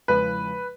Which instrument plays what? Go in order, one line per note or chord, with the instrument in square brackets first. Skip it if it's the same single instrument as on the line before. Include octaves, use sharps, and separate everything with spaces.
[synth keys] E2 C#3 F3 G#3 [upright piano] B4